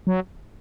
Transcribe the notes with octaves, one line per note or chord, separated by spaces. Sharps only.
F#3